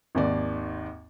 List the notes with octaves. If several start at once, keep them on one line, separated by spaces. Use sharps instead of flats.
G#1 D#2 D5